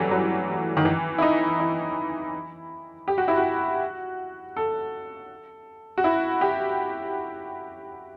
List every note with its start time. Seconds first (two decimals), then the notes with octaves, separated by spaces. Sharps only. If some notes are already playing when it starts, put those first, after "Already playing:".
Already playing: E3 F#3 G3 A3
0.11 F#3
0.77 D#3
0.85 E3
1.18 E4
1.22 D#4
1.60 E4
3.08 G4
3.18 F#4
3.28 E4
3.37 F#4
4.57 A4
5.98 F#4
6.04 E4
6.41 G4